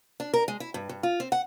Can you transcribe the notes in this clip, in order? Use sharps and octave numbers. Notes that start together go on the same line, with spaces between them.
D4
A#4
G#3
E4
G2
G2
F4
C4
F#5